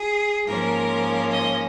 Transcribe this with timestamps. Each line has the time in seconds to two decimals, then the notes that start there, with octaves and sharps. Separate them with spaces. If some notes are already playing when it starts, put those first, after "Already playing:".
Already playing: G#4
0.46 G#2 F3 A#3 C#4 A#4
1.30 D#5